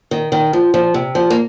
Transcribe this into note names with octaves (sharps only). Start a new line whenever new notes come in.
D#3
D#3
F3
F3
C3
F3
A#3